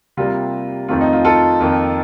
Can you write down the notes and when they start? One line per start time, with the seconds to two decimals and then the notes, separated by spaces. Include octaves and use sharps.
0.17 C3 G3 A#3 F4
0.89 F2 D#3 A3 C4 F4
1.01 D#4
1.13 F4
1.25 F4 A4
1.61 F2 D#3 A#3